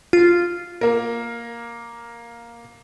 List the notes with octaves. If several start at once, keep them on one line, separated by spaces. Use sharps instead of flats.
F4
A#3 A#4